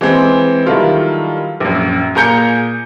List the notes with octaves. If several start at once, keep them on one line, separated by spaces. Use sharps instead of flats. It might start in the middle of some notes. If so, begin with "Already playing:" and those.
E3 G#3 C4
D#3 F#3 G3 E4 F4 A4
A#1 F#2
A#2 G#4 A#5 G6 C#7